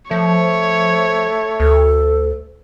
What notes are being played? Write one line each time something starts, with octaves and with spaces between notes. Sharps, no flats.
F3 A3 C#5
D2 A4